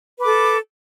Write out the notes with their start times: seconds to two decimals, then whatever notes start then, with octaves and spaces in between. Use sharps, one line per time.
0.18 B4
0.21 D6
0.23 A4